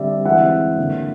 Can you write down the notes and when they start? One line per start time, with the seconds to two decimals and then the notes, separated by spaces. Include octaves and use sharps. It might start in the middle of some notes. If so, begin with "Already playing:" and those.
Already playing: D3 G3 C4 D5 E5
0.25 E3 G#3 C4 E5 F#5
0.78 D3 F#3 A#3